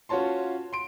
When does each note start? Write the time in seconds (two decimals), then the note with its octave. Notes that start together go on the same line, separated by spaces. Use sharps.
0.09 C#4 F4 F#4 C#5 A5 C6
0.73 C6 D7